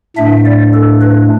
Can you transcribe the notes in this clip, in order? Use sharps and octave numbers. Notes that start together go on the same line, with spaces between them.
A2 A3 D4 E5
D5
A4
B4